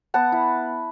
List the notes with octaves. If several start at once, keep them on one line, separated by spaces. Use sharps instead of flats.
B3 F#5 A5
E4